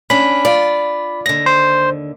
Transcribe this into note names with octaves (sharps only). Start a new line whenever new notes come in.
C#4 D4 B5
F4 D5
D#2 D3 A#6
C5